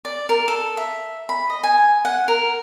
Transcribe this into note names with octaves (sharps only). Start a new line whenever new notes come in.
D5
A#4
A4
E5
B5
D#5
G#5
F#5
A#4